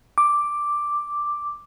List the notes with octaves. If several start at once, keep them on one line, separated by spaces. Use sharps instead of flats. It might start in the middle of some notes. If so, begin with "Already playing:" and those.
D6